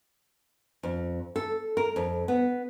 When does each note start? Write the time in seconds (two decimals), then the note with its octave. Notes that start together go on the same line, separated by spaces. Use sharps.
0.83 F2
1.36 A4
1.77 A#4
1.96 F2
2.28 B3